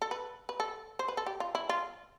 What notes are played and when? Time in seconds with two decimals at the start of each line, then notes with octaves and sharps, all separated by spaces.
0.02 A4
0.11 B4
0.49 B4
0.60 A4
0.99 C5
1.08 B4
1.17 A4
1.26 G4
1.40 F4
1.55 E4
1.69 F4